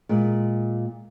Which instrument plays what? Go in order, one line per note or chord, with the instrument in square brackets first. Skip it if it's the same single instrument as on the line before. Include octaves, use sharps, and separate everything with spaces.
[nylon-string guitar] A#2 G#3